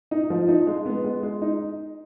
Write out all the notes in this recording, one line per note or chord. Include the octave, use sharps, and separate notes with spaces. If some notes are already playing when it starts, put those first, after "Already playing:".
D#4
F3
D#4
G#3
B3
G#3
G#3
D#4